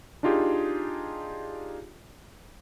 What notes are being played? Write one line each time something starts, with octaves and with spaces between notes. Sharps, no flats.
D4 D#4 F4 G4 G#4